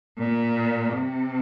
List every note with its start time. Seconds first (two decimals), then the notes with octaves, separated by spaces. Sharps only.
0.19 A#2
0.94 C3